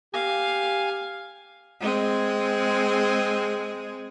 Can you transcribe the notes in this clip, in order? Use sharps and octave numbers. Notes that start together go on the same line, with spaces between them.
G4 F5 G#5
G#3 C4 G#4